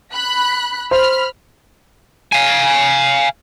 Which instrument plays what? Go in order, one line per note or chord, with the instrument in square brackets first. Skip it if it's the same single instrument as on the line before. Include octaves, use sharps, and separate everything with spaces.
[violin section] B5 F#6
[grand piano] C5 [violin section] B5 F6
[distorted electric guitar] F5 G#5